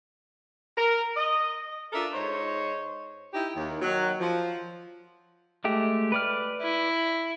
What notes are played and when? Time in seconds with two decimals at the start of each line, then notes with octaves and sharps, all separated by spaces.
0.77 A#4
1.16 D#5
1.92 D4 F4 A4 A#4 E5
2.13 G#2 D#4 C5 C#5
3.33 D#4 E4 G4
3.56 D#2
3.82 D#3 F#3
4.20 F3
5.64 G#3 A3 G4
6.12 B4 D5 F6
6.62 E4